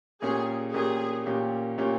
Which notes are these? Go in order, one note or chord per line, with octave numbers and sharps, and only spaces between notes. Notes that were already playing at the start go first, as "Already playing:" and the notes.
A#2 A#3 C#4 G4 G#4
A#2 A#3 C#4 G4 G#4
A#2 A#3 C#4 G4
A#2 A#3 C#4 G4